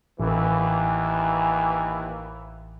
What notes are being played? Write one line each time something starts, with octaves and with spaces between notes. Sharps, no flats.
A1 D#2 E3